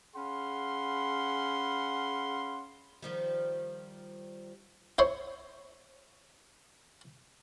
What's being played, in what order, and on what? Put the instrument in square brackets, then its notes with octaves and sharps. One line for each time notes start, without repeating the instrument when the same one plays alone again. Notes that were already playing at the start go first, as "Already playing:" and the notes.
[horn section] C#4 G#4 F5 F#5 B5 C6
[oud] D#3 F3 G3
[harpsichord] E4 C5 C#5